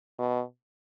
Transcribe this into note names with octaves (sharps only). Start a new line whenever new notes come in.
B2